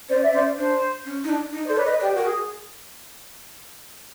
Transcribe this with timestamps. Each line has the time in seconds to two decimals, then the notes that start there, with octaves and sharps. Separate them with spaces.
0.09 C#4 C5 D5
0.21 D5 E5
0.33 C#4 C5 D5
0.57 D4 C5
1.05 C#4
1.24 D#4
1.29 D4
1.52 D#4
1.65 C5 D5
1.69 A4
1.76 B4 C#5 D5
1.85 D#5
1.88 B4
2.00 G4 D5
2.12 F#4
2.17 A#4
2.24 G#4